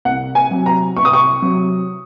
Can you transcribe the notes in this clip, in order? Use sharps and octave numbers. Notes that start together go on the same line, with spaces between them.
C2 F#5
G#5
C3 F#3
A#5
C2 C#6
D#6
C#6
C3 F#3